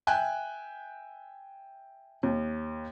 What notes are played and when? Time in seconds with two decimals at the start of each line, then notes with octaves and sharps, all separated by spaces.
0.07 E5 G5 G#5 F#6
2.23 D#2